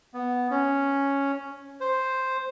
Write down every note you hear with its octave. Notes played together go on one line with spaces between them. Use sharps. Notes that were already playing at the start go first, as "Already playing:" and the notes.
B3
C#4
C5